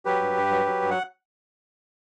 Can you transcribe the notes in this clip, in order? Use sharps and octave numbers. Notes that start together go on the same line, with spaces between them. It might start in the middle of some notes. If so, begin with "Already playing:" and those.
F#3 G4 B4
G2
G2
F#3
F#3
G2
F#5